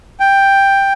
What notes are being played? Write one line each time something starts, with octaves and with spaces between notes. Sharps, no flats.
G5